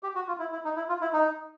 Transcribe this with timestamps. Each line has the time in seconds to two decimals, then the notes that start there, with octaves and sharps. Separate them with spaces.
0.03 G4
0.15 F#4
0.28 F4
0.39 E4
0.52 E4
0.65 D#4
0.76 E4
0.89 F4
1.01 E4
1.13 D#4